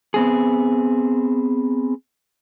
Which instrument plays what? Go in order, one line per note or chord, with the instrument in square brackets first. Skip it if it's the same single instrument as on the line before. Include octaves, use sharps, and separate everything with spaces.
[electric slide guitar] B3 C4 G#4